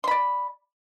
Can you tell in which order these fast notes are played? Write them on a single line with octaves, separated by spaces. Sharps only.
C6 B5 D5